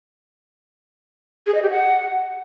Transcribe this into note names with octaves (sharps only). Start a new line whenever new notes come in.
G#4
D#5
G4
F#5